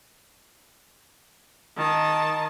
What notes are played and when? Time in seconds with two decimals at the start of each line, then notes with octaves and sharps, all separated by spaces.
1.77 D#3 A5